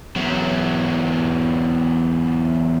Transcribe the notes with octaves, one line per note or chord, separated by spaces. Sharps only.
E2 F#3